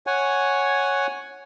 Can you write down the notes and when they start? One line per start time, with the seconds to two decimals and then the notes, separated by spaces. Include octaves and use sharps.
0.07 C#5 F#5 G#5